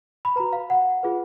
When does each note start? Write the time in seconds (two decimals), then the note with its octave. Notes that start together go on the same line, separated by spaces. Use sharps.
0.25 B5
0.36 F#4 B4 A#5
0.53 F5
0.70 F#5
1.03 F4 G#4 B4